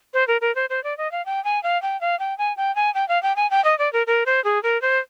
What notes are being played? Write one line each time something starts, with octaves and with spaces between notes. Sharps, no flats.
C5
A#4
A#4
C5
C5
D5
D#5
F5
G5
G#5
F5
G5
F5
G5
G#5
G5
G#5
G5
F5
G5
G#5
G5
D#5
D5
A#4
A#4
C5
G#4
A#4
C5